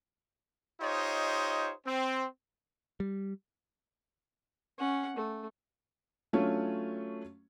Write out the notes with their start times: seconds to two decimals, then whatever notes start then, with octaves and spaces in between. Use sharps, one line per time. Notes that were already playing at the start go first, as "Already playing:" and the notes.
0.81 D#4 F4 G4 C5 C#5 D#5
1.86 C4
3.00 G3
4.78 C#4 F#5
5.17 A3
6.33 F#3 A3 C#4 D4 F4 C#5